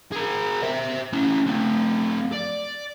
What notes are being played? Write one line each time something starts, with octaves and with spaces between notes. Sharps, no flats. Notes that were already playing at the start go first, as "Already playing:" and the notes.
G#4 A#4
C5 E5
C#4 E4
A3 C4
D5